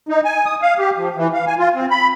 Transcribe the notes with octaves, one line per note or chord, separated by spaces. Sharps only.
D#4
G#5
D#6
F5
G4
F3
E3
F5
G#5
F4
C4
B5